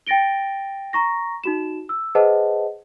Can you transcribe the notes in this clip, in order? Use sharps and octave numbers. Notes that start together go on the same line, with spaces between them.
G5 A6 A#6 D7 G7
A#5 C#6 A#6
D#4 F#4 E7
E6
G#4 B4 C5 D#5 F#5 A5